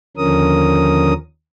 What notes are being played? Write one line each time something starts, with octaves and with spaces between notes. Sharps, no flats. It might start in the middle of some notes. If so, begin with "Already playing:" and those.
D#2 D3 F3 C#4 A#4 D#6